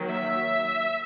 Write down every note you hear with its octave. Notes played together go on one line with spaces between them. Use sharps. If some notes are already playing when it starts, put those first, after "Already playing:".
Already playing: D#3 F#3 A#3
E5